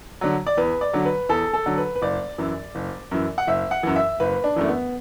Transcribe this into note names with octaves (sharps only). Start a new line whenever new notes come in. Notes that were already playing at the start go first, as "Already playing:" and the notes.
D3 F#3
D5
E2 B4
D5
D3 F#3
B4
E2 A4
A4
D3 F#3
B4
B4
F#1 D5
F#2 E3
F#1
F#2 E3
F#5
F#1 E5
F#5
F#2 E3
E5
F#1 B4
D4
F#2 E3 A3
B3